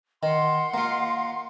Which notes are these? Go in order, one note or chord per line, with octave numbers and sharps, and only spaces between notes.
D#3 F#5 C6
A#3 F4